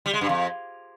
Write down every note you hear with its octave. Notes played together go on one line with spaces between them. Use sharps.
G3
G#3
G2
F2